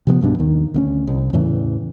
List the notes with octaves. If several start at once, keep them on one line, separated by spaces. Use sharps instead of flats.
C3 F3 A#3 B3
B1 G2 B2 D4
D#2 D#3
D2 A#3 C#4
C2
E2 A2 C#3 E3